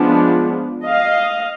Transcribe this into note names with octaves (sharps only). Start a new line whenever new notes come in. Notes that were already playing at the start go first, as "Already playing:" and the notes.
Already playing: F3 G#3 B3 D4
D#5 F5